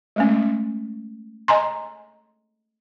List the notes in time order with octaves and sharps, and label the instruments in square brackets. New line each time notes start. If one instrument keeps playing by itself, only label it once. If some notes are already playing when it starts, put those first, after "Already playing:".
[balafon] G#3 A3 C#4
D#5 G#5 A#5 C6